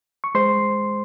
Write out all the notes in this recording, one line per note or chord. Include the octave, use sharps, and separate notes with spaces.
C#6
G#3 C5 C6